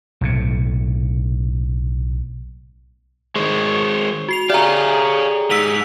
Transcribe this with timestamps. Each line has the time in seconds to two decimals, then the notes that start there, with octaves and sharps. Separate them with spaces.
0.21 B1 A2 C3
3.36 D#3 G#3 C5 C#5
4.29 F#4 C7 F7
4.50 G4 G#4 C#5 D5 E5 F5 A#5
5.50 G#2 E6 B6 F7